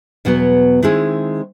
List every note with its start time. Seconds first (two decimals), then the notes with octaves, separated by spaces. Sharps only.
0.25 E2 B2 F#3 B3
0.83 D#3 G#3 C4 E4 G#4